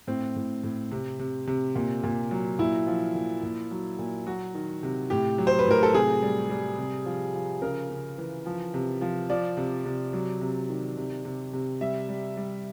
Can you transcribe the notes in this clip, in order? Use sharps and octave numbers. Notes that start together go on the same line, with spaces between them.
A2 C4
A2
A2
C3
C3
C3
A#2
A#2
F#3
A#2 E4
F3
A#2
A#2
F#3
A#2
F#3 F#4
D#3
C3
A2 G4
F#3
C5
B4
A2 A#4
A4
C3 G#4
G3
G3
C3
F3
F3
C#3 A#4
C#3
E3
F3
C3
F3
F3 D5
C3
C3
F#3
C3
D#3
C3
C3
C3
G3 E5
G3
G3